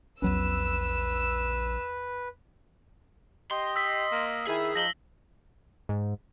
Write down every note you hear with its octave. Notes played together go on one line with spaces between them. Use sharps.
A#1 E2 F#3 C#4 B4 E6
G4 D#5 C6
E6 B6
A#3
D#3 E4 G#4 E5
F3 D#4 A#6 F#7 G7
G#2